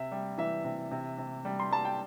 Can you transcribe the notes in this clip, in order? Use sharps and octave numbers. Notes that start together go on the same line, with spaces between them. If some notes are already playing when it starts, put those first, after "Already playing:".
Already playing: C3 E5
G3
E3 E5
C3
C3
C3
G3
C6
G3 A5
G5